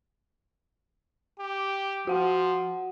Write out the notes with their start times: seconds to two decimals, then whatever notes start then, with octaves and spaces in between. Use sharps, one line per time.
1.39 G4
2.07 F3 F#4 F#5